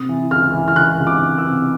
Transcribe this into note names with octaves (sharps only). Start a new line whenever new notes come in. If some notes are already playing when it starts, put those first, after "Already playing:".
Already playing: C3 D#6
E3
C#2 F6
E3
F6
C#2 F#6
C#2
D6
C#2
E6
C3